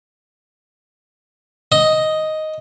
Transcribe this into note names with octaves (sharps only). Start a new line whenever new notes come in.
D#5